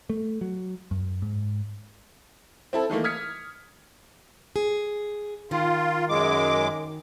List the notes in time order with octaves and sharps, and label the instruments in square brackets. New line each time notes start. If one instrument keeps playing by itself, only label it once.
[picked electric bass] A3
F#3
F#2
G#2
[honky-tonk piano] C4 E4 A4
D#3 E3 A3 A#3
D#6 F6 G#6 B6 C#7
[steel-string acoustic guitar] G#4
[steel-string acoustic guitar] D#3 [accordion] F4
[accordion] F#2 G#3 D6